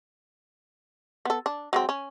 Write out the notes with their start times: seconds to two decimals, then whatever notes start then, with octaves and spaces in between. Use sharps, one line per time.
1.25 B3 A4
1.46 D4
1.73 F#3 G#3 C4
1.89 C#4